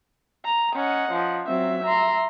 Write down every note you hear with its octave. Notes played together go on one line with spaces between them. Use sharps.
A#5
C#4 D#5 F#5
F3
F#3 C4 E5
A#5 C6